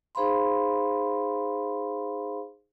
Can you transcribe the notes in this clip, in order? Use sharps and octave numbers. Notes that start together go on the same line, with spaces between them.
D#4 G#4 C5 F5 B5 C6